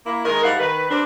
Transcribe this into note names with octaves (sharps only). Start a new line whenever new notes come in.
A#3 E4
D#3 G#3 A#4
G#2 G3 E4 F5 F#5
D#3 B4
G3 C4 D4